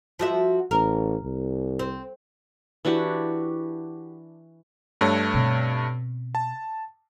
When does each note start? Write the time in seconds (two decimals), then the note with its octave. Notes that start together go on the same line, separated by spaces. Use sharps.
0.19 F3 F#4 E5
0.71 A1 A#4
1.24 C2
1.79 C4
2.85 E3 D4 F#4 G4
5.01 G2 A3 C#5
5.34 B2 C4
6.35 A5